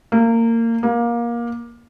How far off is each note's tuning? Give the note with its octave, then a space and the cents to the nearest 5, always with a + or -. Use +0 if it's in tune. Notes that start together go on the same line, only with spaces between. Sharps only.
A#3 -25
A#3 +20